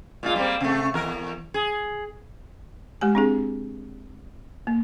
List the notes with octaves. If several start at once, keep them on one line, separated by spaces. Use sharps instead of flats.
A#2 G#3 F4
G3 A#3 C4
C3 A3
E2 A#4
G#4
G#3 G4 G#5
C4 D4 G#4
A#3